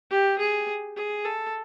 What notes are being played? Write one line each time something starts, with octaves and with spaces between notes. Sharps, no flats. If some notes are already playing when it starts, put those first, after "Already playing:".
G4
G#4
G#4
A4